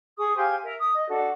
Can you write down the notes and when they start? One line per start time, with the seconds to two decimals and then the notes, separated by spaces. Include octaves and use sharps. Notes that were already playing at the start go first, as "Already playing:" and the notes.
0.18 G#4 C#6 D#6
0.36 G4 C5 F5 G#5
0.64 A#4 E5
0.79 D#6
0.94 D#5
1.08 D4 F#4 A4